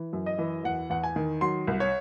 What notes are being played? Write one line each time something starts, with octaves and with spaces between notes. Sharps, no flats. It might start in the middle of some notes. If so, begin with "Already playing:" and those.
Already playing: E3
F#2
D#5
E3
E2 F#5
E2 F#5
G#5
D#3
F#3 C6
C2
C#5